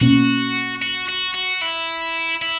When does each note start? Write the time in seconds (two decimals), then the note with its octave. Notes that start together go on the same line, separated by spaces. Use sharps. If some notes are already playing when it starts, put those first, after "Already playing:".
0.01 B2 A#3 C#4 F#4
0.82 F#4
1.08 F#4
1.34 F#4
1.62 E4
2.42 E4